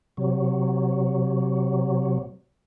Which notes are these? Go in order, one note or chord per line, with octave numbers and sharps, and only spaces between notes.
C3 F#3